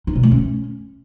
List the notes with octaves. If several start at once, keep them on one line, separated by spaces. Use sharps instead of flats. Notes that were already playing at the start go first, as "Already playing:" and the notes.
D#4
B2
A3
C#4